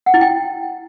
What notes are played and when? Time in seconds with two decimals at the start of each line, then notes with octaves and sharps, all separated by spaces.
0.06 F#5
0.14 E4
0.21 G5